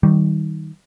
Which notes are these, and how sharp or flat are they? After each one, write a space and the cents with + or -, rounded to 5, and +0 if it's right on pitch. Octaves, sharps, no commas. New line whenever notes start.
D#3 +15 G3 -20